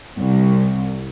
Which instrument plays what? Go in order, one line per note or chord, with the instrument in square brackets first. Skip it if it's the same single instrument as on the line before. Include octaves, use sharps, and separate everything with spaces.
[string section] C2